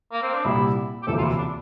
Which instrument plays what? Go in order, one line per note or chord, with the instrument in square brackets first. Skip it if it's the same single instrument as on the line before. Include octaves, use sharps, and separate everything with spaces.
[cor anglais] A#3
C4
D4
[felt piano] C2 A#2 G3 [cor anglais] E4
[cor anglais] G4
[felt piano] E1 D2 C3 F3 A#3 [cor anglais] A4
[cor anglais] F4
E4
D4